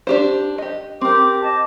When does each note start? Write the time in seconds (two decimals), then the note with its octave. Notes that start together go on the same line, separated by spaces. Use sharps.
0.07 D4 G4 C5
0.58 G4 D#5
1.01 C4 G4 A#4 D6
1.41 D#5 A5 D6